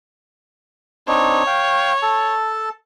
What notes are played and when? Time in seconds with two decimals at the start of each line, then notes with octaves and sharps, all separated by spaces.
1.08 C4 D4 D#4 C#5
1.47 F5 G5
2.03 A4 A5